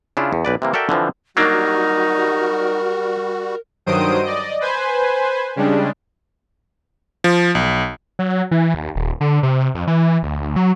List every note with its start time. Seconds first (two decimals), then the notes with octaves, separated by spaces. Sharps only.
0.17 C#3 D4 E4 F4
0.33 E2
0.45 B1 B4 D5
0.62 C3 E3 A#3
0.73 F#4 A4 A#4 D5 E5 G5
0.89 D3 E3 F3 C4
1.37 F#3 G3 A#3 D4 D#4 F#4 A#4
3.86 G2 D#3 F#3 C5 D#6 D7
4.24 D5 D#5
4.61 B4 C5 G#5
5.56 C#3 G3 G#3 D4
7.24 F3
7.55 B1
8.19 F#3
8.51 E3
8.74 D#2
8.95 D#1
9.21 D3
9.43 C3
9.75 F2
9.87 E3
10.23 D2
10.56 F#3